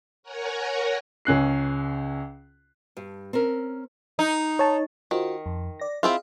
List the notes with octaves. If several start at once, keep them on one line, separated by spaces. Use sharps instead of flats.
A#4 C#5 F#5 G#5 A#5
C#2 C#4 F#6 C7
G2
C4 C#4 A#4
D#4
C#5 A5
D#3 F4 F#4 C5
F2
D5 A#6
C4 E4 F4 G#4 D#5 F5